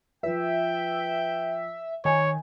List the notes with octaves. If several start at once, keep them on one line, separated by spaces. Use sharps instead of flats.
F3 B4 E5 G5
D#3 C#5 G#5